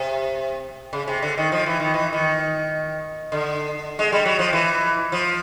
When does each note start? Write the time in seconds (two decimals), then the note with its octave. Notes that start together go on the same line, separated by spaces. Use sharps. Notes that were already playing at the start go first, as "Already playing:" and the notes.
Already playing: C3
0.93 C#3
1.08 C3
1.22 D3
1.38 D#3
1.52 F3
1.66 E3
1.80 D#3
1.94 E3
2.13 D#3
3.32 D3
3.99 G#3
4.12 G3
4.25 F#3
4.39 F3
4.53 E3
5.12 F3